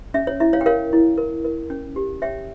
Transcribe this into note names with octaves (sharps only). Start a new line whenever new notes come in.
C#4 E5
C#5
E4 E5
C#5 F5
G5
A#4 C#5 F5
E4
A#4
A#4
C#4
G4
C#5 E5 G5